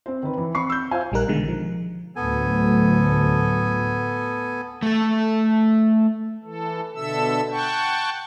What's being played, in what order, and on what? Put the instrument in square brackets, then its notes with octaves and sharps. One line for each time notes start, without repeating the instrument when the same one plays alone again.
[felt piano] C4 C5
D#3 B4
E3
C4 B5 C#6 C7
E6 G6
F4 C5 F5 G#5
[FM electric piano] A#1 G3 D#4 A#4 F#6
B2 D3 D#3 G#3
F3
[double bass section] D2 A2 F#3 [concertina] B3 A4 G#5
[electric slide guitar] A3 A4
[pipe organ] E3 A4
B2 D3 A4 E5 E6
F#5 G5 A5 C#6